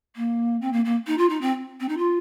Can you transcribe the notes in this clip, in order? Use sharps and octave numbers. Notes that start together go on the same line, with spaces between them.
A#3
C4
A#3
A#3
D#4
F4
D#4
C4
C4
D#4
F4